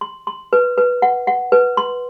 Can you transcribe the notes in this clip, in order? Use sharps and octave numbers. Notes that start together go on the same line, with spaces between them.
C6
C6
B4
B4
F#5
F#5
B4
C6